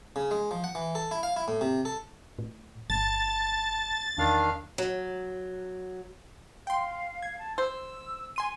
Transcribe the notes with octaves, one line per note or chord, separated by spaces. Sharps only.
C#3
G#3
F3
F#5
E3
A4
E4
F5
E4
A2
C3
A4
A2
G1 A5 A6
E2 D#3 D4 F5
F#3
F5 G5 C6
G#6
A5
C5 E6
G#5 C6 D#7